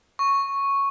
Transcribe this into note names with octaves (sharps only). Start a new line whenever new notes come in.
C#6